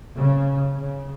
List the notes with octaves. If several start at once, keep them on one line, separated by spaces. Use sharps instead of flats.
C#3
C#3